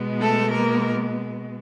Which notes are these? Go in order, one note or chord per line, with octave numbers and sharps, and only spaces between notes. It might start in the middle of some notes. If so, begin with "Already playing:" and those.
Already playing: B2 G#3 B3
A3 A4
A#3 A#4